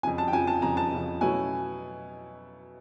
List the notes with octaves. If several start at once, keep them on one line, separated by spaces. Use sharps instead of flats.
F2 C#3 F3 G#5
A5
G5
F2 C#3 F3 G#5
A5
F2 C#3 F3 A#5
A5
F2 C#3 F3
B2 F#3 A3 C#4 E4 G#5